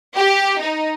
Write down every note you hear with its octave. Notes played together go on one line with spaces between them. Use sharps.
G4
D#4